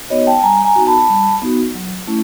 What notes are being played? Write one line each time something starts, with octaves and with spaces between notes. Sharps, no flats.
B3 D#4 F#4 C#5 D#5
G5 A5
G3 G#5 A#5
G#5 A#5
B3 D#4 F#4
A5 B5
G3
B3 D#4 F#4
F#3
A3 C#4 E4